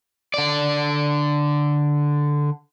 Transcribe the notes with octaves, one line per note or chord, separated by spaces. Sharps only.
D3 D5